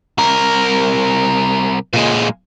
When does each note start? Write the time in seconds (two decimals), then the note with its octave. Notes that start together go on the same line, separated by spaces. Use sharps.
0.18 C2 A#4
1.93 A#2 G#3